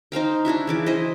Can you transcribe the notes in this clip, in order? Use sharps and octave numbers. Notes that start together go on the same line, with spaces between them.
D#4 C5 F5 G5
D4 E4 F#4 E5
C#3 E3 D6
E4 C5 D#5